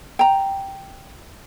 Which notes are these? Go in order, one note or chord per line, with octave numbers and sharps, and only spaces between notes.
G5 A#5